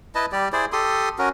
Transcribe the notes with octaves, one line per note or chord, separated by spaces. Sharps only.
E4 B4 D#5 A5
G3 G4 D5
E4 G#4 C5 D5
G4 A4 C6 D#6
C#4 F#4 A#4